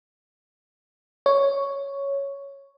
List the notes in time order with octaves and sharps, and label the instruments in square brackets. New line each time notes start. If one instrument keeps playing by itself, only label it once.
[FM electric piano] C#5